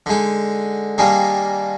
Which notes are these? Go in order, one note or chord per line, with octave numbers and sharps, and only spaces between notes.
D3 G#3 D#4
D#3 G3 A#3 D4 G#4